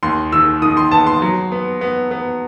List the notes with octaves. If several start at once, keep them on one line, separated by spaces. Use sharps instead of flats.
D#2 C6
D#3 E6
D#3 D#6
C6
B3 A5
C6
F#3
B3
B3
B3